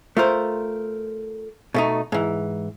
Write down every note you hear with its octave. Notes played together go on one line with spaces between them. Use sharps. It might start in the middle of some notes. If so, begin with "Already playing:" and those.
A3 F4 A#4 C5
B2 A3 D#4
G#2 E3